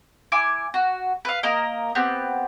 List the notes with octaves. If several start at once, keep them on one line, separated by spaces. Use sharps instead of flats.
E4 G#5 D6
F#4
B4 F5
A#3 A#4 D#5
B3 C4 G4